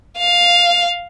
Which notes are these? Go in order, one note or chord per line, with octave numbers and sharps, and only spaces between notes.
F5